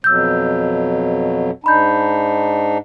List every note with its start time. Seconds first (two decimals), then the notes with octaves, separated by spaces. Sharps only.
0.04 F2 B2 F#3 E6 G6
1.64 G#2 D4 D#4 A#5 B5 G6